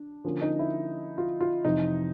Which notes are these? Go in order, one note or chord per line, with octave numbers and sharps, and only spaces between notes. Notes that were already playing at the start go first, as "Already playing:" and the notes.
Already playing: D4
D3 F3 A#3 C#4
D#4
E4
F4
F4
F2 C3 E3 D#4